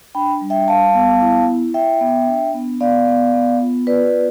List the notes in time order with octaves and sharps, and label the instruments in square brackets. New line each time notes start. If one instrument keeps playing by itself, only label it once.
[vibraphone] D4 G5 B5
G3
E5 G5
G3 F5 A5
B3
E4
E4
E4 E5 G5
B3
D4
B3
B3 D5 F5
B3
B3
F4
F4 B4 D5
B3